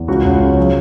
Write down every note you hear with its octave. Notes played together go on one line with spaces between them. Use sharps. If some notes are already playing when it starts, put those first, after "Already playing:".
Already playing: E2
C#2 F#4
C#2
C#3
F#3